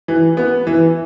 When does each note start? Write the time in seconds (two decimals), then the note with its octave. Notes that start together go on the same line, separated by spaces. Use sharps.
0.08 E3
0.37 B3
0.67 E3